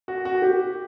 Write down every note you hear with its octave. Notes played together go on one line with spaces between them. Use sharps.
F#4
F#4
G4